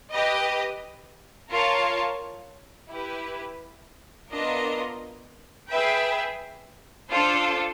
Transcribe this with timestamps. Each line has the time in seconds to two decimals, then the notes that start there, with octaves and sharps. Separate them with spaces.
0.11 G4 B4 D#5
1.50 F4 A#4 C#5 F5 A5
2.90 E4 G4 B4
4.30 B3 D4 F4 A#4 D#5
5.68 G#4 B4 E5 G5
7.08 D4 F4 A4 C5